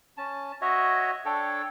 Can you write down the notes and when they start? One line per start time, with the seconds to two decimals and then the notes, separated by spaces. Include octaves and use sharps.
0.17 C#4 A5
0.61 F#4 C#5 D#5 E5
1.25 D4 A4 C#5 G5